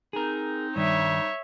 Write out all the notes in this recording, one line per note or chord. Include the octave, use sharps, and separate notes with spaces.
C4 D#4 G#4 A#4
G2 D#3 G3 D#4 C#5 E5